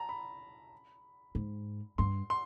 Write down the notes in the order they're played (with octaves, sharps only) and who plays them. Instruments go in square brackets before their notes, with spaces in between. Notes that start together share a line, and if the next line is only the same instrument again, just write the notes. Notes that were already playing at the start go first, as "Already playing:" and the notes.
Already playing: [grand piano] A5 A#5
B5
[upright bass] G#2
[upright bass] G2 [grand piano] C6
[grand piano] C6